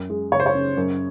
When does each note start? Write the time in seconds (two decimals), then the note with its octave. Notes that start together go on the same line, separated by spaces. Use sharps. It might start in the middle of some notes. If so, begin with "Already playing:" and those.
Already playing: F#2
0.10 G#3
0.31 F#1 C#5
0.40 C5
0.46 C#5
0.55 C#3
0.77 F#2